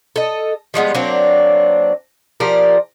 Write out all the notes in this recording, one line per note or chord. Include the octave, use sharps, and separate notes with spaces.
A4 D#5
F3 G3 G#3 B3
F#3 A#3 C4 D4
F3 G4 A#4 D5